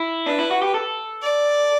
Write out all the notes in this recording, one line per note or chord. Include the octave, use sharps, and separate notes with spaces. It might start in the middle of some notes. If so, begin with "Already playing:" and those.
Already playing: E4
D4 B4
E4
F#4
G4
A4
D5